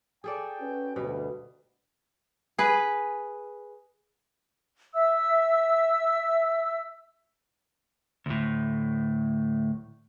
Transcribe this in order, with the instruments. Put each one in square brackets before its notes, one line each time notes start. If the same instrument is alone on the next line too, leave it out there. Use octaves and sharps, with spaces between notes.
[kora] G#4 A4 D5 [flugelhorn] G5
[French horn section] C#4 F#4 B4
[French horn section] D2 G2 [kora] B2 [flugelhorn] G3
[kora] G#4 B4
[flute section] E5 E6
[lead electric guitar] D2 A2